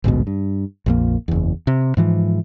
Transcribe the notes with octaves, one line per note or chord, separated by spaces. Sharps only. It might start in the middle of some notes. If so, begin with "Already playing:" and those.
A1 D2 G#2 B2
G2
A#1 F2 A#3
F#1 E2
C3
G#2 E3 F3